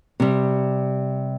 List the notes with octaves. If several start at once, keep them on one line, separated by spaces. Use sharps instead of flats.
C3 G3